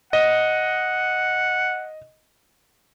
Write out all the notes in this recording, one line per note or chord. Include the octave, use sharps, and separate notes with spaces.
D#5 F#5